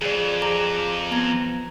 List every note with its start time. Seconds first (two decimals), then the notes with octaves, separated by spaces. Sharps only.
0.02 F2 G#4 D5
0.42 G#4 A#5 D6
1.11 B3 A#5 G#6